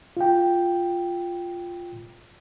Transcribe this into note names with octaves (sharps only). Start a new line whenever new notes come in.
F4 G5